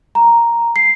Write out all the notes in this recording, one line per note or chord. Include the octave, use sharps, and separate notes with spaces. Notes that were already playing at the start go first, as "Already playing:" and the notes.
A#5
C7